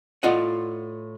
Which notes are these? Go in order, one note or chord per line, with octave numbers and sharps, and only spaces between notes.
A2 F4 D5 D#5 F#5